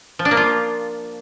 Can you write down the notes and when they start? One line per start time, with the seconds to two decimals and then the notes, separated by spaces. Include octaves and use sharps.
0.19 F3
0.25 D4
0.31 A#3
0.37 F4